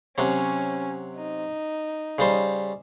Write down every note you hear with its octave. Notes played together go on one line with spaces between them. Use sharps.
C3 F#3 C#4
D#4
C#3 G3 C5